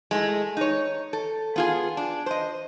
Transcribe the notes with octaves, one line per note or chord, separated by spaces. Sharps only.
G#3 A3 E4
D#4 C#5
A4
B3 F4 G#4
D4
C5 D#5